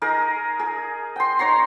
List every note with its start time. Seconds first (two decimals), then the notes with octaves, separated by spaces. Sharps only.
0.02 D#4 G#4 A#4
0.59 G#4
1.16 G5 C6
1.39 D#4 C#5 A#5 C6